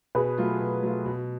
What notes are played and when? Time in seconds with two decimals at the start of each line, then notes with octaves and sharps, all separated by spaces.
0.15 B2 G#4 B4
0.38 F#3 A3 F4
0.60 B2
0.83 F#3 A3 F4
1.06 B2